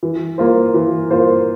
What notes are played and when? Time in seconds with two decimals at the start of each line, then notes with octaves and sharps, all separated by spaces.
0.03 E3
0.38 A#3 F4 C5
0.74 E3
1.10 A#3 F4 C5